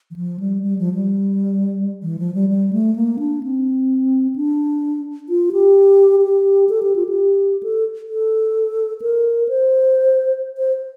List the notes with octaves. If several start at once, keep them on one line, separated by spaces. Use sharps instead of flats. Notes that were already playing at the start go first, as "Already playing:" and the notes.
E3
F3
G3
G3
F3
G3
E3
F3
G3
G3
A3
A#3
D4
C4
D4
F4
G4
G4
A4
G4
F4
G4
A4
A4
A#4
C5
C5